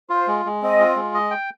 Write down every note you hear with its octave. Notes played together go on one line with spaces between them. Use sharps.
F4 C5
G#3
G#3
C4 D#5
F4
G#3
D#5
G5